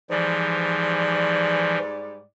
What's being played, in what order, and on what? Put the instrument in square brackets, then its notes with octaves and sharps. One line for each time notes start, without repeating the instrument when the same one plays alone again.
[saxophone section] G#2 G3 D5 [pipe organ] E3 F3